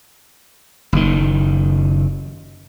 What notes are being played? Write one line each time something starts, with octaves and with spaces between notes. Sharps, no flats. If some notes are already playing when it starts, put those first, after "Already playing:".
F#1 D#3